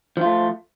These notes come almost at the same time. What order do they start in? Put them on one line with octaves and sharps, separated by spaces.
F3 F4 A3